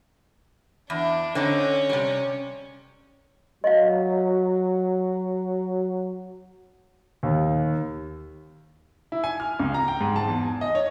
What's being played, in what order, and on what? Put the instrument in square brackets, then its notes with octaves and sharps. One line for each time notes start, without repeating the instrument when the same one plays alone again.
[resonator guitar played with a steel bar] E2 [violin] D4
[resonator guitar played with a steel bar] D3 C4 D#4 [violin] C#4
[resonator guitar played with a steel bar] C3 G3
[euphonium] F#3 [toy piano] D#5 F5
[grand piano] D#2
[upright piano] E4
G#5
F6
C#2
A#5
G5
G#2
A5
E2
G#5
D#5
C#5